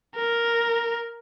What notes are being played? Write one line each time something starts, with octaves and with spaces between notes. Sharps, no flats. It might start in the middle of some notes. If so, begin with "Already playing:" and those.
A#4